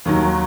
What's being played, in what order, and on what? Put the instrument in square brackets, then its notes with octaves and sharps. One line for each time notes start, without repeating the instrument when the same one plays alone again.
[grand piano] D#2 D#3 F#3